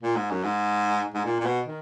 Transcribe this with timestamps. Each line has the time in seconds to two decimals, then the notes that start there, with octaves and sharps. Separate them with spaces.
0.02 A#2
0.16 G#2
0.31 F#2
0.44 G#2
1.14 G#2
1.25 A#2
1.40 A#2
1.45 B2
1.66 D#3